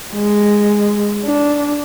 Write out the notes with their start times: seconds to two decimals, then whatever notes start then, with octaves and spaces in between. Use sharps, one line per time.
0.13 G#3
1.24 D4